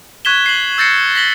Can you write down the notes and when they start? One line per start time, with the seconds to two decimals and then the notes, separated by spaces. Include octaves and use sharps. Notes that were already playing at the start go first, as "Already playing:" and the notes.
0.25 C#6 F#6 G#6 B6 E7 G7
0.46 C7 F#7
0.78 E6 G6 A6 A#6 C7 C#7
1.15 A#6 B6 F#7 G7